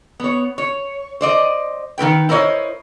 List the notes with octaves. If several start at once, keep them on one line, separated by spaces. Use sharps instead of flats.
B3 C#5
C#5
C5 D5 D#5
D#3 C4 B4 G5
E4 A#4 C5 C#5 D#5